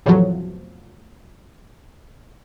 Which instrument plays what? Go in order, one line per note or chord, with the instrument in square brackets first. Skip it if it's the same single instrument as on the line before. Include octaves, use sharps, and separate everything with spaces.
[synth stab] E2 A2 C3 F3 F#3